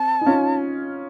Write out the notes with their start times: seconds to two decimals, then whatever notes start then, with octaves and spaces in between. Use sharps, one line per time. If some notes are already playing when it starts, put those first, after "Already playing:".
Already playing: C4 A5
0.21 D#4
0.26 C#4 F4